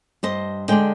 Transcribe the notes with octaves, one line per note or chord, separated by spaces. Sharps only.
G2 C5 D#5
D3 G#3 D4 D#5 G5